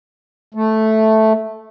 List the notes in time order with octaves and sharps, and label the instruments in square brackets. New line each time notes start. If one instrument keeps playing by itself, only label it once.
[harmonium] A3